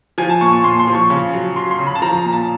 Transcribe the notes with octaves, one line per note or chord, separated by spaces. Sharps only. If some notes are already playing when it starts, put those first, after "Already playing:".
F3 G#5
A5
A#2 C#6
C#6
A#2 C6
C6
F3
C#6
C#3
F#3
F#3 C6
C6
C#3
B5
A5
F3 A#5
A#5
A#2
A5